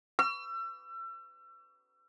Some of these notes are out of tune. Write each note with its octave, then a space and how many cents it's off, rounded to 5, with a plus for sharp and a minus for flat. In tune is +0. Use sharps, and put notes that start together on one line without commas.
E6 +35